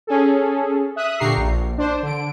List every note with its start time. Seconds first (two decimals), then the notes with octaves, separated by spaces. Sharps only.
0.07 C#4 G#4 A4
0.96 E5 D#6 F#6
1.19 A#2 D3 G4 A#5 C#6 C7
1.37 A#1
1.78 D4 C5
2.03 D3 D7